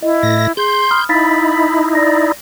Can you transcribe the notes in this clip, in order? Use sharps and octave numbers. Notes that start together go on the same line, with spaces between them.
E4 D#5
A2 A#6
G#4 C6 G6
B5 D#6 F6
D#4 E4 F5 B5 A6 B6
D5 A#6